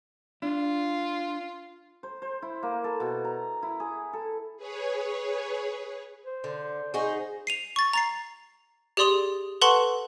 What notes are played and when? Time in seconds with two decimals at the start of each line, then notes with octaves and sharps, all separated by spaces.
0.42 D4 F4
2.03 C5
2.22 C5
2.42 E4
2.63 A#3
2.84 A4
3.00 B2
3.24 A#5
3.62 E4
3.80 G#4
4.13 A4
4.57 G#4 B4 C#5
6.25 C5
6.44 D3
6.94 D#4 F#4 G#4
7.47 C7 D#7 F7
7.76 C#6 A6
7.93 A#5 A6 C7
8.97 G4 G#4 D5 C6 D#6 F7
9.61 A4 B4 F#5 A5 C6 C#6